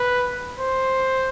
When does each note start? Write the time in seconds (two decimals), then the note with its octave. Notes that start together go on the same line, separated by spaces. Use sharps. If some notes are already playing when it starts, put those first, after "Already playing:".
Already playing: B4
0.58 C5